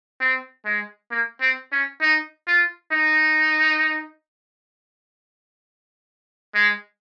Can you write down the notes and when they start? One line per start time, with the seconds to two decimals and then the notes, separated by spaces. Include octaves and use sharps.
0.21 C4
0.65 G#3
1.11 A#3
1.41 C4
1.72 C#4
2.01 D#4
2.47 F4
2.92 D#4
6.55 G#3